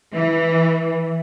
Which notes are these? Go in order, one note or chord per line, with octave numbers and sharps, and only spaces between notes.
E3